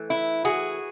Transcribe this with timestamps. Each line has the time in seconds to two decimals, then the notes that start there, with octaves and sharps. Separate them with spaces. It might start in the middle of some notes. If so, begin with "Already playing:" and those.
Already playing: E3 A3
0.10 E4
0.45 F#4 G#4